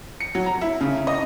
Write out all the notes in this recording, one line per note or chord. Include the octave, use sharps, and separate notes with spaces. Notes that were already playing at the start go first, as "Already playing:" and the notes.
C#7
F#3
A#5
E4
C#3
D#5